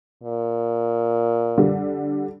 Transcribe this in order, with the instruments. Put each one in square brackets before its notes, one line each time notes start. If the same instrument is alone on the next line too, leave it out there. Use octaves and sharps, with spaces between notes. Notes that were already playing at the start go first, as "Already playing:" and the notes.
[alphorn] A#2
[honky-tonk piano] D3 G3